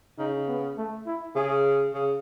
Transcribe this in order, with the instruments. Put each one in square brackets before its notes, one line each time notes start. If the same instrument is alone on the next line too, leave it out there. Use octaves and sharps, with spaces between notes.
[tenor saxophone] C#3 [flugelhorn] D#4
[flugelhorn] B3
A3
E4
[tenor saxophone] C#3 [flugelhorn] G#4
[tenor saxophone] C#3